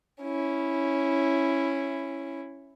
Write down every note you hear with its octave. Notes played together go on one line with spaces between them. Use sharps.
C#4 E4